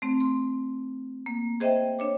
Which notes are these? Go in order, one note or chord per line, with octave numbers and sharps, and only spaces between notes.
A3 C4
C6
A#3
G#4 C5 D#5 E5 G5
D4 C#5 D6